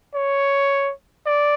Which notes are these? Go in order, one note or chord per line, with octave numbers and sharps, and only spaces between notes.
C#5
D5